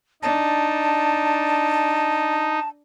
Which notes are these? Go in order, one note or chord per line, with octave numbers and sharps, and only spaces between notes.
D4 D#4 A5